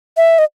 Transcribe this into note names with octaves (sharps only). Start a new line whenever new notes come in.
E5
D#5